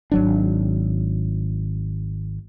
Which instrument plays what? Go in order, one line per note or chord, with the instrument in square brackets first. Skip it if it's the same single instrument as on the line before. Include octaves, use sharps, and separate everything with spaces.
[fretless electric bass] G#1 F#3 D4